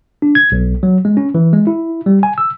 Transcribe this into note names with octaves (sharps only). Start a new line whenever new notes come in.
D4
G#6
B1
F#3
G#3
C#4
E3
G#3
E4
G3
G#5
E6